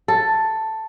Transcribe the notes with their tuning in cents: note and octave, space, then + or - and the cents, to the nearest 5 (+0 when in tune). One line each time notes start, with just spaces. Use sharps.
A4 +5